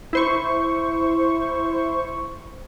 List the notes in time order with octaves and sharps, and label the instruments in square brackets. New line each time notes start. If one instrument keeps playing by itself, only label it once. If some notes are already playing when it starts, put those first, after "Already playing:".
[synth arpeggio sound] E4 C5 C#6